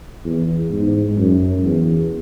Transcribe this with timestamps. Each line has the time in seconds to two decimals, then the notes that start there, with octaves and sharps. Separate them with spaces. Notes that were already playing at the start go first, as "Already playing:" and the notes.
0.25 E2
0.71 G#2
1.18 F#2
1.64 E2